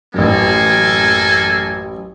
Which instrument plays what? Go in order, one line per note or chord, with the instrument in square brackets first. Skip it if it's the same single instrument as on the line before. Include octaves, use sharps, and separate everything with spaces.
[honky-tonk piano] A1 F#2 [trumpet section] A#3 A4 G#5